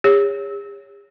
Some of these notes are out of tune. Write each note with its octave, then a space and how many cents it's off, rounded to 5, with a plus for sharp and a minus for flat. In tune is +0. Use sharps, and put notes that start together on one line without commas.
G#4 -45 C#5 +0